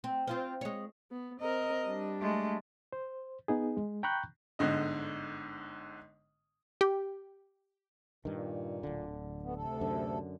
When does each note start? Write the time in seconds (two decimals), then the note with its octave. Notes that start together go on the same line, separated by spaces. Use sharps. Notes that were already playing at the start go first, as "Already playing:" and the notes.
0.04 C4
0.27 C4 F4 C5
0.61 G#3 C#5
1.11 B3
1.40 C4 A#4 D#5
1.87 G3 D4
2.21 G#3 A3
2.93 C5
3.48 B3 D#4 G#4
3.77 G#3
4.03 G5 A#5 B5 C#6 F#6 G6
4.59 G1 G#2 D3 D#5
6.81 G4
8.25 G2 A#2 D#3
8.83 D1 D3
9.42 A3 B3
9.56 D2 C3 A4
9.81 F#2 D3